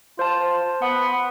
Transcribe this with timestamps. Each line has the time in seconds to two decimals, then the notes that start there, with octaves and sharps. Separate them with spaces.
0.19 F4 C5 A5
0.82 B3 F#5